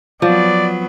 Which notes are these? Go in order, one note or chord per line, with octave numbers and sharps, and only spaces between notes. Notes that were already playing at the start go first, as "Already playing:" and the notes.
F3 F#3 B3 D5